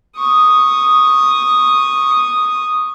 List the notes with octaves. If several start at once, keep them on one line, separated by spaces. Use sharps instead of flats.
C#6 D#6